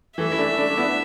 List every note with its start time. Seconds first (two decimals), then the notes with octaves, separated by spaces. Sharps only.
0.18 E3 A3 E5
0.32 E4
0.38 A3 D4
0.57 A3 D4
0.70 D4
0.77 B3 E4